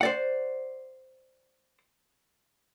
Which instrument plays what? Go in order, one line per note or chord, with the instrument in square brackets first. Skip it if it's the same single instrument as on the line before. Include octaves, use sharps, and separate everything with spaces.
[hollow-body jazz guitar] C5 D5 F#5